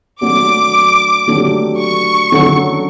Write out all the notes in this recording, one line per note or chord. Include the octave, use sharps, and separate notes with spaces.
F#3 A3 D4 F#4 D6
D3 F#3 A3 D4 G4
C#6
D3 F#3 C#4 F#4 A4